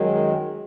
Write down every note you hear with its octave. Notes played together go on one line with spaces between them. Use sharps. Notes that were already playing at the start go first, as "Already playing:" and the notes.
Already playing: F#2 D#3 G#3